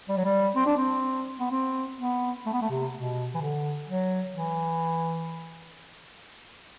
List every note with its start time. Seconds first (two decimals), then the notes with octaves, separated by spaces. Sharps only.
0.09 G3
0.17 F#3
0.25 G3
0.56 C4
0.66 D4
0.77 C4
1.40 B3
1.51 C4
1.99 B3
2.46 A3
2.53 B3
2.62 A3
2.70 C3
2.94 B2
3.35 E3
3.41 D3
3.88 F#3
4.35 E3